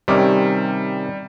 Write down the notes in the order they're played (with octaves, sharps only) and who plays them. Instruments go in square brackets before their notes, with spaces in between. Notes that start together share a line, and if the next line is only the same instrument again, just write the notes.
[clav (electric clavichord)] C3 D#3 C#4 [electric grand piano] G3 D6